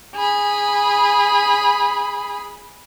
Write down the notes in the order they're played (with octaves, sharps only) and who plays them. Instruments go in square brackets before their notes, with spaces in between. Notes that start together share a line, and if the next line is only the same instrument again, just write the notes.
[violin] G#4 B5